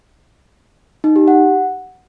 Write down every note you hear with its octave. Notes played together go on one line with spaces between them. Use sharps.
D#4
G4
F#5